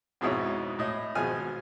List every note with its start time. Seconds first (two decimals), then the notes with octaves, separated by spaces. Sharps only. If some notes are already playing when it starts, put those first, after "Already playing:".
0.21 F2 G#2 B2 D#4 E4 C#5
0.79 A2 D#5
1.15 G#1 B2 F3 G#4 G#5 F6